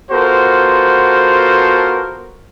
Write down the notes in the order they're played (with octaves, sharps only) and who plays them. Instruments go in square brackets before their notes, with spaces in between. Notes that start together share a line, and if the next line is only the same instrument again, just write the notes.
[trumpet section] B3 F4 F#4 A4 A#4 C5